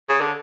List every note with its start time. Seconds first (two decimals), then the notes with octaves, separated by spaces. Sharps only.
0.09 C#3
0.21 D3